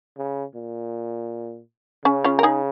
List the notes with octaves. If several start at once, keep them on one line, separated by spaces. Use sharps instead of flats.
C#3
A#2
C#3 C#4
C#4 F4
A#4
D#4 G#4